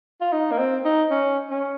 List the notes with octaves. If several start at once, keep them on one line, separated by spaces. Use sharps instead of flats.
F4
D#4
A#3
C4
D#4
C#4
C#4